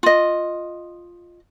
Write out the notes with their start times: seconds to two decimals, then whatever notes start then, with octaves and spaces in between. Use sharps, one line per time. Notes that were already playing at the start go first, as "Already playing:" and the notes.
0.03 F4 D#5